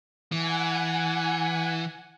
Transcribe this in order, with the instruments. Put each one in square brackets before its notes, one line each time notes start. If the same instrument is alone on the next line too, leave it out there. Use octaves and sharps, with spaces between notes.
[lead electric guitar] E3 [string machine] F#5 G#5